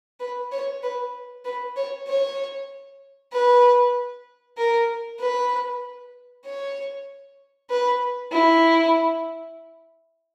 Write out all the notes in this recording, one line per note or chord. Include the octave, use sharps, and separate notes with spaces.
B4
C#5
B4
B4
C#5
C#5
B4
A#4
B4
C#5
B4
E4